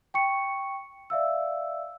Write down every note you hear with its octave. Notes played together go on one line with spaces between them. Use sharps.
G5 C#6 C#7
D5 E5 F5 E6